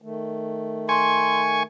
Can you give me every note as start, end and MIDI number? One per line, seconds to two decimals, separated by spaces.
0.02 1.63 51
0.02 1.63 57
0.89 1.63 80
0.89 1.41 84
0.89 1.63 85